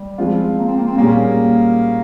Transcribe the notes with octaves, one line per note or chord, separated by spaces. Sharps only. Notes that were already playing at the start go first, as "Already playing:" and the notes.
Already playing: G3
F3 G#3 C4 F4
A#3
C4
A#3
C4
A#2 G3 A#3 C#4 G#4